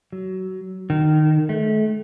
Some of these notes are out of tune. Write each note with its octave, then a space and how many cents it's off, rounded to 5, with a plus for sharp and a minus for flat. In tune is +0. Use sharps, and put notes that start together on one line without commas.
F#3 +20
D#3 -15
A3 -35